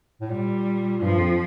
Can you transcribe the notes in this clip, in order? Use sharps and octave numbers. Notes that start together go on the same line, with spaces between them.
A2
A#2 G3
G2 F3
F2